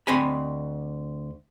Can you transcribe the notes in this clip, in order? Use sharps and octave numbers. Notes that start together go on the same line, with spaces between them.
D2 C4 D#5 G#5 B5